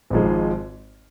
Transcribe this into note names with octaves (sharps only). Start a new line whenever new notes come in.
G#1 G#2 F3 G#3